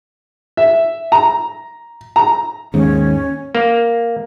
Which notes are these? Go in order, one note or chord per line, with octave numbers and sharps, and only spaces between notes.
E5
A#5
A#5
D#2 G#2 C#4
A#3